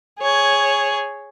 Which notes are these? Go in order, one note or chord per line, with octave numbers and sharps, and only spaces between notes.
G#4 C#5